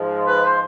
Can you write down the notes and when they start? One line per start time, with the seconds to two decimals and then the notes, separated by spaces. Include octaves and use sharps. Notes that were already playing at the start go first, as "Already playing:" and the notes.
Already playing: G#2 F3 G#3
0.28 B4
0.44 C5